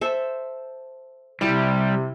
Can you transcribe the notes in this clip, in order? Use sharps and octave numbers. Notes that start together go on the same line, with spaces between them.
A4 C5 E5
C3 G3 E4 G4 A5